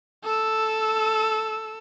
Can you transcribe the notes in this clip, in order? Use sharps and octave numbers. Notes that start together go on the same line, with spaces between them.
A4 E6